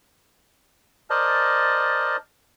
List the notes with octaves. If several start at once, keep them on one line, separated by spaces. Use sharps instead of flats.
A#4 C5 D5 D#5 A5